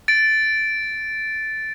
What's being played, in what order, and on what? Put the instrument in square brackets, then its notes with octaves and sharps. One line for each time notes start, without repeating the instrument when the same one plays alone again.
[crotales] A6 D7